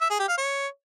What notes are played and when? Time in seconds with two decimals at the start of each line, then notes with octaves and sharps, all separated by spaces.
0.01 E5
0.10 G#4
0.19 G4
0.29 F5
0.38 C#5